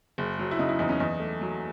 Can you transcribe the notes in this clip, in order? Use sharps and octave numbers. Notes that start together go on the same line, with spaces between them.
F#1
F#3
E4
C#3 D#4
E4
E2 D#4
C#4
E2 D#4
A3
F#3